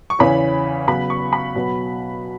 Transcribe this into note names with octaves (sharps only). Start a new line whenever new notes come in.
C#6
E2 C#3 E3 C#4 B5
C#3 F#3 B3 B5
C#6
B5
B2 F#3 B3